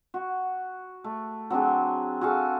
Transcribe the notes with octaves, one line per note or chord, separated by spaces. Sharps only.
F#4
A3
F#3 C4 D4 G#4
F#4 G#4 A4 F5